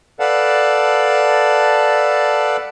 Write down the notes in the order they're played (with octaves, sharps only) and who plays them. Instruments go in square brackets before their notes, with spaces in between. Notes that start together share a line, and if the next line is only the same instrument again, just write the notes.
[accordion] A4 B4 D5 F5 F#5 A5